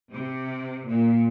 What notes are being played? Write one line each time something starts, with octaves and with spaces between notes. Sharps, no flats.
C3
A#2